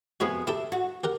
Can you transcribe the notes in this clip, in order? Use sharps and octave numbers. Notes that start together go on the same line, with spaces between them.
F2 C3 B3 E4 F#4 G#4
E4 G4 A4 E5
F#4
G4 A#4 F#5